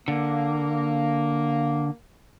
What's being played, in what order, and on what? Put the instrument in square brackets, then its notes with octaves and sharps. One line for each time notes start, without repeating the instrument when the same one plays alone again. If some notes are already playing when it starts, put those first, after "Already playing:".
[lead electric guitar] D3 [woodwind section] A#3